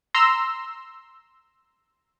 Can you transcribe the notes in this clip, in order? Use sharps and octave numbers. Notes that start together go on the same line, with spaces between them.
A#5 C6 E6